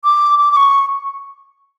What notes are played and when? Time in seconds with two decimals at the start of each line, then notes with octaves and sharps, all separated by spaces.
0.04 D6
0.39 D6
0.52 D6
0.56 C#6